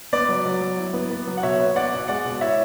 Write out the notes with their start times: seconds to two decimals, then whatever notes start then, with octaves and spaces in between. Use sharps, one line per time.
0.13 B3 D5
0.29 F#3
0.46 F#3
0.62 F#3
0.78 E4
0.94 B3
1.11 B3
1.27 F#3
1.37 F#5
1.43 B2 C#5 E5
1.59 B3
1.75 B3 D5 F#5
1.93 B2
2.08 G#3 D5 F#5
2.25 B2
2.41 E4 C#5 E5